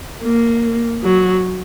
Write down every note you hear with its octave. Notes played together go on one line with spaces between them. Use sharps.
A#3
F#3